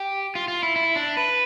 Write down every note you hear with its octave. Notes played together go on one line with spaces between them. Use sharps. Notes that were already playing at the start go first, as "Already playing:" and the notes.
Already playing: G4
F4
F4
E4
E4
D4
B4